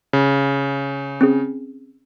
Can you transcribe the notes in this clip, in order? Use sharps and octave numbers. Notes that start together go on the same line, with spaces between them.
C#3
C4 C#4 G#4